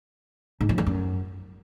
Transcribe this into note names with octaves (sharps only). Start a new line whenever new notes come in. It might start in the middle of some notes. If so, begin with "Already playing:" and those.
G#2
F3
E2
F#2